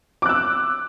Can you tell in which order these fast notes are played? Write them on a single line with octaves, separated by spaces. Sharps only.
D6 F#6 E6